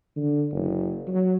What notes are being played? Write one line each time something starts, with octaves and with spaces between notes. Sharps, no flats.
D3
F#1
F#3